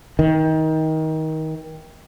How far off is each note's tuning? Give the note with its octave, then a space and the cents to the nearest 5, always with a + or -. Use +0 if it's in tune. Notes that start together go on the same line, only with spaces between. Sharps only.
D#3 +25